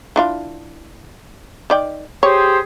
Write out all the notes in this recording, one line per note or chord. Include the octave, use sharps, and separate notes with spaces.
E3 D4 F4
D#3 D5 G5
G4 G#4 C5 C#5